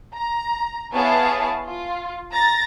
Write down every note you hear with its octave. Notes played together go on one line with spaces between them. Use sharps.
A#5
B3 E4 G#4 C#5 F5 A5
F4
A#5 A6 A#6